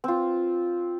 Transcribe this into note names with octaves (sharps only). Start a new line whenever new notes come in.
C4 F4